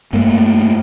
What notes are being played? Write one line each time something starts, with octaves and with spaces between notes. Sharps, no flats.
G2 A3 A#3